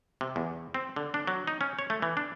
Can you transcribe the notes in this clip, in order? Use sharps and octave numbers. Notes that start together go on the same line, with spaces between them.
C3
E2
C4
D3
D4
F#3
D#4
C#4
C#5
A3
E3
D4